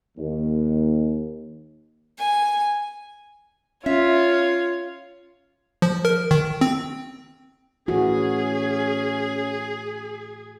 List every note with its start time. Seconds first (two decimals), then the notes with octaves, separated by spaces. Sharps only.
0.17 D#2
2.18 G#5
3.86 C#4 F4 C#5 E5
5.82 F3
6.05 A#4
6.31 D#3
6.61 C4
7.88 A2 E3 C#4 F#4 G#4